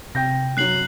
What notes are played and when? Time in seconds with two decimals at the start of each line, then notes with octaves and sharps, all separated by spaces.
0.15 C3 G5 G6 A#6
0.57 F#2 F#3 F#6 C7 F#7